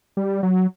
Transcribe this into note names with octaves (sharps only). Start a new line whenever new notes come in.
G3
F#3